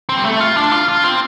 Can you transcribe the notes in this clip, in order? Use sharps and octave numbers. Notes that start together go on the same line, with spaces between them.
C4
G3
A3
F4
D4
F4
F4
C4